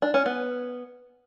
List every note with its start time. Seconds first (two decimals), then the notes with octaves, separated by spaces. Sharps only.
0.02 D4
0.14 C#4
0.26 B3